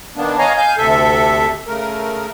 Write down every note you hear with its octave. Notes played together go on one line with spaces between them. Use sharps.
D#3 A#3 B3 D4
C#5 D#5 F5 G#5 A#5
F5 G#5 G6
D2 C3 A4 E5
C#3 A3 A#4